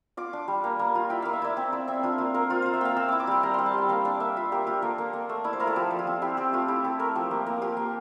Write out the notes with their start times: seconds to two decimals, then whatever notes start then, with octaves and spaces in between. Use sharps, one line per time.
0.17 F4 D6
0.33 D4
0.48 G3
0.64 A#3
0.79 A#3
0.95 F4
1.10 E4 G5
1.22 A#3 F5
1.33 E5
1.42 E4 D5
1.57 C4
1.72 E4 D5
1.88 C4 E5
2.03 D4 F4
2.18 A#3 F4
2.34 A#3 A#4
2.50 F4 C5
2.62 F4 C5
2.73 E5
2.81 A#3 F5 G5
2.97 C4 E6
3.09 E4 D6
3.20 D6
3.27 G3 C6
3.43 G3 A#5
3.54 G3 C6
3.66 A5
3.74 G3 G5
3.89 A#3 F5
4.05 D4 D5
4.20 A#3 E5
4.37 F4 E5
4.52 A#3 G4
4.67 F4 G4
4.82 A#3 A4
4.98 A#3
5.13 A#3
5.29 A3
5.44 E4 D5
5.53 C5
5.60 E4 A#4
5.67 A4
5.76 F3 G4
5.91 F3
5.99 F4
6.07 C4
6.22 E4 G4
6.37 C4 G4
6.53 A3 F4
6.68 E4 G4
6.84 E4 A4
6.99 A3 A#4
7.15 F3 G4
7.31 A#3
7.46 A#3
7.62 F4 G4
7.77 A#3